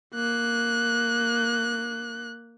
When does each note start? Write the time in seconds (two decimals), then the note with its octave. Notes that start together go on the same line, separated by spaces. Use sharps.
0.15 A#3 F#6